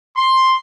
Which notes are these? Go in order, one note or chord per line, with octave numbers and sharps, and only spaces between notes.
C6